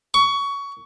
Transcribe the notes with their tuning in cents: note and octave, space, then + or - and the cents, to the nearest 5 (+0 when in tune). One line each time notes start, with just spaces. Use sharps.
C#6 +20